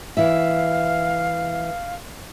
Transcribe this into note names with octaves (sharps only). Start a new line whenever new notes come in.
E3 E4 E5 F5